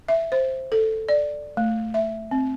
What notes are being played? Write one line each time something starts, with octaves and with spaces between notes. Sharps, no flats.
E5
C5
A4
D5
A3
E5
C4